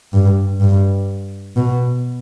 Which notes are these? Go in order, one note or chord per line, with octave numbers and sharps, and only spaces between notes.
G2
G2
B2